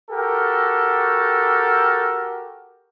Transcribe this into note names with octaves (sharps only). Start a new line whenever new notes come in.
F#4 G4 A4 A#4